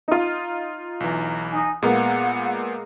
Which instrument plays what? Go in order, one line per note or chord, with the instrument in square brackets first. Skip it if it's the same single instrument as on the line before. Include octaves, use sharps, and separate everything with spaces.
[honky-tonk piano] D#4 F4
[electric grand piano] B1 E3 [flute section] A#5
[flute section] D#4 G#5
[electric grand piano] A#2 B3 [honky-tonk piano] G#3 A#3 [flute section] F#5